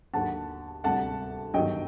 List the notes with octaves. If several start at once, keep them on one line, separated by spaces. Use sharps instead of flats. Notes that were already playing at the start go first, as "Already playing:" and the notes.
D#2 D3 F#3 F#5 A5
D2 C3 G3 F#5 A5
G1 G2 D#3 F#3 D#5 G5